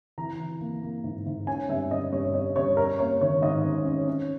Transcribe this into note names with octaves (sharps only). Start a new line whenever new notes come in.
E3 A#5
E3
A#3
A#3
G#2
G#2
C#4 G#5
G2 E5
C#4 D#5
G2 C#5
C#4 D#5
G2 C#5
C#4 A#4
A#3 C#5
D#3 C#5
G#2 D#5
C#4
C#4
C#4